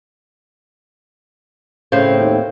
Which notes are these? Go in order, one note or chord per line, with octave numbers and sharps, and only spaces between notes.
A2 C#3 C4 F5
D#2